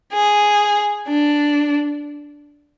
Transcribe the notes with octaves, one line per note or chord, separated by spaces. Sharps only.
G#4
D4